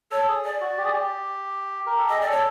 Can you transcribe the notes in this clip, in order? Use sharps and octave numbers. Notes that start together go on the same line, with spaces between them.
A4 C#5
G#4
D5
F#4
G4
G#4
G4
A#4
A4
G#4 D#5
G#4 D5
A4 C#5